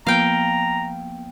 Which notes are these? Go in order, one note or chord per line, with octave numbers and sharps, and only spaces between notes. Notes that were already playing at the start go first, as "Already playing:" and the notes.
F3 A#3 B3 F5 G5 A#5